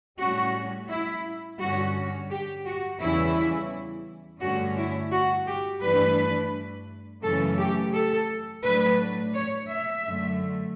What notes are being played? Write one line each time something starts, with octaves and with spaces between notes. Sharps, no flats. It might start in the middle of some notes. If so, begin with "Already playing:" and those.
A2 G3 C#4 F#4
E4
G2 D3 G3 C#4 F#4
G4
F#4
E2 C#3 E3 G3 C#4 E4
G2 D3 A3 C#4 F#4
E4
F#4
G4
G2 E3 A3 D4 B4
F#2 C#3 E3 A3 C#4 A4
G4
A4
A2 F#3 A3 D4 B4
C#5
E5
F#2 D3 A3